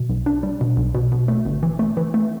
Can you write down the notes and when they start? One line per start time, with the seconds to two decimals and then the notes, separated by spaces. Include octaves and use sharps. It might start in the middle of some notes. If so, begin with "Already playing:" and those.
Already playing: B2
0.09 B1
0.26 D4
0.43 G3
0.61 B2
0.77 B1
0.95 B2
1.12 B2
1.28 A3
1.45 G1
1.63 E3
1.79 A3
1.97 E3
2.14 A3